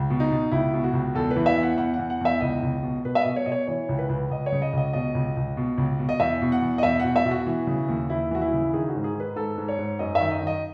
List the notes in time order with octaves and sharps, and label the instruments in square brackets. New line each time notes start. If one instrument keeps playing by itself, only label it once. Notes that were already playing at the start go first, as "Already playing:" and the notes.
Already playing: [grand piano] C#2
B2
D#4
B2
C#2 E4
B2
F#4
C#2
E2 A4
B4
E3
E5
E2
F#5
E2 F#5
F#5
E2
F#5
E2 E5
C#2 D#5
C#2
B2
B2 B4
E5
B2 D#5
C#5
B2 D#5
C#5
E3 C#5
C#2
B4
C#2
C#2 D#5
C#5
C#3
D#5
C#2 D#5
B2 D#5
C#2
C#2
B2
C#2
B2
D#5
E2 E5
B2
F#5
E2
D#5
E2 E5
B2 F#5
E5
B2
F#4
E3
C#3
D#2
D#2 E4
E3 F#4
E4
C#3
D#3 G#4
F#4
G#2
G#4
D#3
B4
G#2 A4
G#2
C#5
G#2
F#2 D#5
D#3 E5
D#5
D#3
D#5